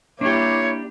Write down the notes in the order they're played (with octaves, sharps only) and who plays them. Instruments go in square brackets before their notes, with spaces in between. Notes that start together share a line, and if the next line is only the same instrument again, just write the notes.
[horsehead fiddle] A#3 E4 [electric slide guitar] D4 G4 [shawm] C#5